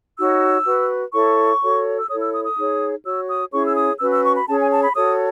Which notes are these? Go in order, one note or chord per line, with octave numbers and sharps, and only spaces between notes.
D#4 F#4 C#5 E6
F#4 B4
E4 A4 C#5 C#6
F#4 A4 C#5
E6
E4 A4 C#5 D#6
E6
D#6
D#6
D#4 G#4 C#5
F#4 C#5 E6
D#6
C#4 E4 G#4 C#5 C#6
E6
D#6
C#4 F#4 B4 E6
E6
C#6
B5
C#4 G#4 C#5 A5
G#5
A5
B5
F#4 A4 C#5 D#6